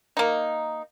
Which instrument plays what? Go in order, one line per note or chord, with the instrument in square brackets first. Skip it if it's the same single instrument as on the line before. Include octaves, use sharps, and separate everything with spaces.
[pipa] A#3 D#4